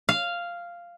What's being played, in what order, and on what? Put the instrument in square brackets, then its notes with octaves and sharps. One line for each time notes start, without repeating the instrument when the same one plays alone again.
[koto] F5